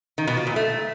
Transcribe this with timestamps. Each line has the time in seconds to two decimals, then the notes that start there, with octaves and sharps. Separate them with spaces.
0.18 D#3
0.27 B2
0.37 F3
0.47 A#2
0.56 A3